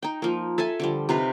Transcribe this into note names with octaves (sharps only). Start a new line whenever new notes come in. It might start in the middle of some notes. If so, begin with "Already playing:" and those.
D#4 G5
F3 A#3
A4 E5 G#5 A5
D3 F3 G3
C3 D#4 F4 B4